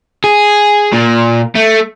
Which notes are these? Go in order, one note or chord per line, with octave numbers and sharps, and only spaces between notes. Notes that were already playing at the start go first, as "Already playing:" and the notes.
G#4
A#2
A3